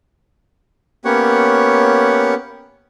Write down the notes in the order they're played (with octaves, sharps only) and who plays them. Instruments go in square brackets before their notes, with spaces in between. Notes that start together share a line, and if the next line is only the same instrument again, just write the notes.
[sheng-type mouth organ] A#3 B3 C#4 G4 C#5 F#5